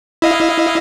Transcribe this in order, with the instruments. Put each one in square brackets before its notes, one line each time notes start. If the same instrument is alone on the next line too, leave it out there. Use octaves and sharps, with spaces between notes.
[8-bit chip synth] E4 D#5 F5